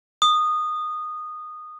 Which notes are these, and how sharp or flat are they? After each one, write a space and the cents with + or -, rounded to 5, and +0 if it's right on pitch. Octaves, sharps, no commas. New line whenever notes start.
D#6 -15